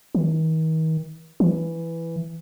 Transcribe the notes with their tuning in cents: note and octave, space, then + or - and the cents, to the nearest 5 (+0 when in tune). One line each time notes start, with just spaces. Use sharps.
D#3 +40
E3 +5